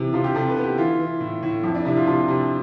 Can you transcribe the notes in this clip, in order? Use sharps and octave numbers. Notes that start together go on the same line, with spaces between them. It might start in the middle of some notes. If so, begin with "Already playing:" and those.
Already playing: C3 E3
C3 F4
G4
C3 A4
B4
B3
G4
E4
E3 F4
E3
A2
A2
F2 E4
D4
C3 E4
F4
C3 F4
C3